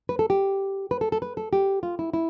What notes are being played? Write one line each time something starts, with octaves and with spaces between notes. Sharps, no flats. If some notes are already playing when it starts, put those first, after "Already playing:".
B4
A4
G4
B4
A4
A4
B4
A4
G4
F4
E4
E4